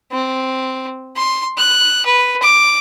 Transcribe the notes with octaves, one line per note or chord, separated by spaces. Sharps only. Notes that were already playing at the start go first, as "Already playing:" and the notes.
C4
C6
F#6
B4
D6